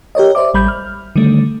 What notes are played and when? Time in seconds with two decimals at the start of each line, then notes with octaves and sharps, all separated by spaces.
0.15 G4 A#4 C#5 D#5
0.35 C5 D5 E5 D6
0.54 A1 G3 B5 G6
0.68 F6
1.16 D3 D#3 G3 A3